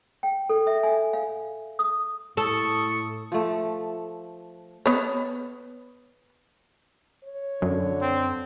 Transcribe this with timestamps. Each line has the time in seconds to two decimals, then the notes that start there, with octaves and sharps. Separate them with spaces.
0.23 G5
0.49 A4
0.67 E5
0.83 G#5
1.13 F5
1.79 D#6
2.37 A2 A4 C#6 D#6
3.32 F3 A3
4.86 B3 C#5
7.24 C#5
7.62 F#2 D3
8.02 C4